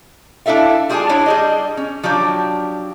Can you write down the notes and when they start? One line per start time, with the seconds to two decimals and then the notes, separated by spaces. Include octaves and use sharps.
0.46 D4 E4 A4 E5 F5
0.89 G3 F4 G#4 D#5 G#5 A5
1.09 D4 E4 C#5
1.26 G3 G#4 D#5
1.77 C#4
2.03 F3 F#3 D4 G4